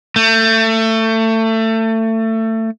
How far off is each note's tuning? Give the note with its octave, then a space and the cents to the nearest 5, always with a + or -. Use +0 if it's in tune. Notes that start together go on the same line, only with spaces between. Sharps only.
A3 +25